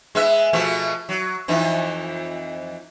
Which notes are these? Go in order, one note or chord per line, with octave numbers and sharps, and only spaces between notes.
G#3 B3 E5
B2 F3 A3
F#3
F2 E3 D#4